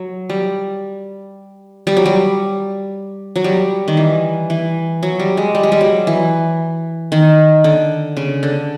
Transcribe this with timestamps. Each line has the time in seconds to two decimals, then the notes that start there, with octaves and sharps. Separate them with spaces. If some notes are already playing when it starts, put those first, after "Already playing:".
Already playing: F#3
0.29 G3
1.87 G3
1.97 F#3
2.06 G3
3.36 F#3
3.44 G3
3.88 D#3
3.97 E3
4.50 E3
5.03 F#3
5.20 G3
5.37 G#3
5.55 G3
5.63 G#3
5.72 G3
5.81 F#3
6.07 E3
7.12 D#3
7.64 D3
8.17 C#3
8.43 D3